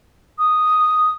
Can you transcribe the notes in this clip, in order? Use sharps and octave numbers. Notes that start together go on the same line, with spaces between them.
D#6